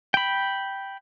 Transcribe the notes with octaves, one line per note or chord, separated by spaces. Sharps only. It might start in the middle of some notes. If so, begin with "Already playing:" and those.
G5 B5